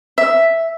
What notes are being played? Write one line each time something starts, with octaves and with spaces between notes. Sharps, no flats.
E5